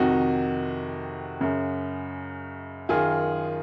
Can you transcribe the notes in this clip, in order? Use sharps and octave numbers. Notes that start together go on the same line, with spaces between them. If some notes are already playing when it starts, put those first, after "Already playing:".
Already playing: F2 C3 D#3 D#4 F#4
F#2 C#3
F#2 D#3 F4 G#4